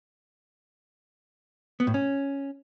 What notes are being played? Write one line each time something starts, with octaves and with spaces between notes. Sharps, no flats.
B3
A2
C#4